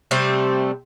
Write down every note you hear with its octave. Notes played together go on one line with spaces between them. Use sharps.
C3 G3 A3 C4